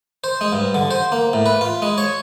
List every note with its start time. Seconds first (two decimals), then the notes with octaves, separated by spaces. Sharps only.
0.24 C5
0.41 G#3
0.53 G2
0.74 D3
0.91 C5
1.12 A#3
1.33 A2
1.46 B4
1.61 F4
1.82 G#3
1.98 C#5